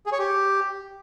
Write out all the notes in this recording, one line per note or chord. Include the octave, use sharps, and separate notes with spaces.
G#4
C#5
G4